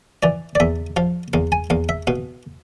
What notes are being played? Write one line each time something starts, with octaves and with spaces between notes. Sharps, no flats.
E3 D5
D5
E2 E5
F3 F5
E2 F5
G#5
E2 F5
E5
B2 F5